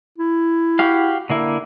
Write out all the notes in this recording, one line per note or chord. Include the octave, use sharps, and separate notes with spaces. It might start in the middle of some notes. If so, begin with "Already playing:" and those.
E4
F#4 G4 F5
D3 A#3 E4